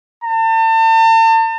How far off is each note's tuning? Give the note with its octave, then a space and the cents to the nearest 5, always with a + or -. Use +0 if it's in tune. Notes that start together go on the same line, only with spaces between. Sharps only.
A5 +40